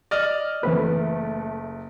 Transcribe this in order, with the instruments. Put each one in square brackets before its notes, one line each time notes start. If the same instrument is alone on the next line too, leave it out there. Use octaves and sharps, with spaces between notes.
[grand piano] D5 D#5 F6
[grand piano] F#1 [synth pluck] E3 C4 B4 [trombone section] A3